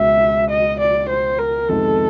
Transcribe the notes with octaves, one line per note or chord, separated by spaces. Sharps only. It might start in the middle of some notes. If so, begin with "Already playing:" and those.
Already playing: C#2 B2 G#3 B3 E5
D#5
D5
C5
A#4
F2 C3 D#3 G#3 B3 A4